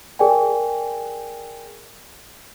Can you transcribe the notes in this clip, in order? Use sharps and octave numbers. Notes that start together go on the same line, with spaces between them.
G#4 A#4 D5 G5 G#5